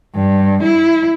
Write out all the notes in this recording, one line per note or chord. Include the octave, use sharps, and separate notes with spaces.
G2
E4